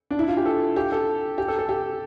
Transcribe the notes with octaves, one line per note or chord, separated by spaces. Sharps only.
D4
E4
F4
G4
A4
G4
A4
G4
A4
A4
G4